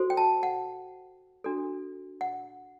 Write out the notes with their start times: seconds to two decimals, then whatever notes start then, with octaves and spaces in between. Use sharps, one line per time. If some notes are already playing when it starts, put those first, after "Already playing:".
Already playing: F#4 A4 C5
0.10 G5
0.17 A5
0.43 F#5
1.44 D4 F#4 A4
2.21 F#5